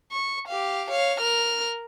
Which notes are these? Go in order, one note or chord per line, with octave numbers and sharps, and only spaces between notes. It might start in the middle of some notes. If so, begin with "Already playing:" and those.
C#6
G4 F5
C#5 F5
A#4 F6